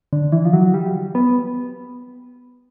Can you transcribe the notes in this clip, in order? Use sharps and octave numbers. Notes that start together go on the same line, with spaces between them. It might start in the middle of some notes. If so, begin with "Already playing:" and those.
D3
E3
F3
F#3
G3
B3